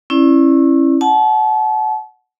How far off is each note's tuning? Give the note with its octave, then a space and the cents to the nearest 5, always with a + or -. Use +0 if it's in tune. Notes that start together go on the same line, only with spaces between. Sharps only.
C#4 -30 E4 +0 D5 +0
F#5 +0 A5 -30